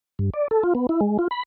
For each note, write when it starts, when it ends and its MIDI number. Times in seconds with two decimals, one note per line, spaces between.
0.19 0.30 43
0.34 0.48 74
0.51 0.63 69
0.63 0.73 65
0.75 0.87 59
0.89 1.00 64
1.01 1.17 56
1.19 1.28 65
1.31 1.43 83